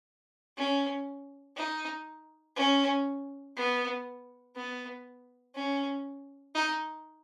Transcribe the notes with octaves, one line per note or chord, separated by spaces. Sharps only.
C#4
D#4
C#4
B3
B3
C#4
D#4